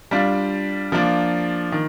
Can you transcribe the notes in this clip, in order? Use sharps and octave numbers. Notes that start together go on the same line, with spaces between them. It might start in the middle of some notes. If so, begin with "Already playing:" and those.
G3 D4 F4
F3 A#3 D4
D#3